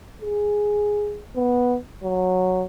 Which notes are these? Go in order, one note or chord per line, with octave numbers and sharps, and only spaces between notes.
G#4
B3
F#3